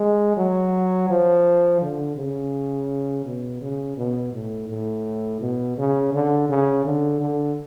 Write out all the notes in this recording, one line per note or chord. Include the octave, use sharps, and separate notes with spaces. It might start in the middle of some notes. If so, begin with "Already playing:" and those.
Already playing: G#3
F#3
F3
D3
C#3
B2
C#3
B2
A2
A2
B2
C#3
D3
C#3
D3
D3